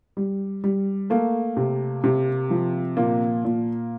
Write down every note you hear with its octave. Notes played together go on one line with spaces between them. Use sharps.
G3
G3
A3 A#3
C3
C3
F3
A#2 A#3
A#2